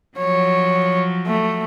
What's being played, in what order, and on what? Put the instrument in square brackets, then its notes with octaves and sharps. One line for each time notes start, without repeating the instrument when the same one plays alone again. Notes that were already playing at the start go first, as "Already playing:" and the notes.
[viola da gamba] F3 F#3 [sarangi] C#5
[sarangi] A3